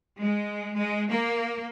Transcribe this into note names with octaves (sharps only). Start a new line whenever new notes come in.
G#3
G#3
A#3